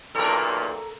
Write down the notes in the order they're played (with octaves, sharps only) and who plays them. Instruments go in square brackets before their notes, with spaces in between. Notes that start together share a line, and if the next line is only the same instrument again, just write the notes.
[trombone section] B1 E2 A#2 [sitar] A4 A#4